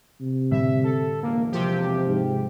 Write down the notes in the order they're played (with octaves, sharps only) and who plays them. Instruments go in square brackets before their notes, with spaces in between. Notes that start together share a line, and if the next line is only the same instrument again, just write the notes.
[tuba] C3
[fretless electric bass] A2 D3 G3 [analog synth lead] E5
[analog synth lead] A4
[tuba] E1 [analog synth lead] A#3
[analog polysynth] C3 G4 [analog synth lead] F3
[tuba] G#2